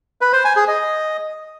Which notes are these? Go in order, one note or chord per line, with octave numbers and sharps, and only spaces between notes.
B4
C5
G#5
G#4
D#5